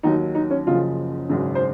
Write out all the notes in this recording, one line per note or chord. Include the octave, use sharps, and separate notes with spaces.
D#2 D#3 F#3 D#4
D#4
C#4
F#1 F#2 C#3 F3 F4
G#1 F#2 C#3
C5